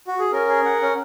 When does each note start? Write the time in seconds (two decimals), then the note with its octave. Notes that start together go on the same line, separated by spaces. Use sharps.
0.07 F#4
0.19 G#4
0.32 C#4 A#4
0.48 G#4
0.65 F#5
0.82 C#4